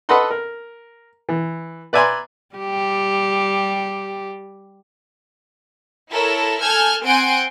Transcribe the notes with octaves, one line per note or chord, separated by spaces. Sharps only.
A4 B4 D#5 F#5 B5 C6
A#4
E3
B4 D5 E5 G#5 A#5 C6
G3 G4
E4 A4 A#4 C#5
A4 G#5 F6 G6 G#6
C4 F#5 G#5 C6 G6 D7